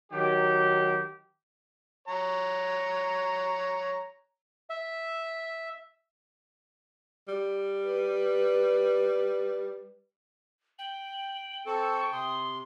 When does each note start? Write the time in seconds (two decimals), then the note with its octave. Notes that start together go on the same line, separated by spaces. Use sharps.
0.12 D#3 F#3 G4
2.08 C#5 A#5
4.70 E5
7.28 G3
7.86 B4
10.79 G5 F#7
11.66 C4 A4 G5 A5 C#6
12.12 C3 C6 D#6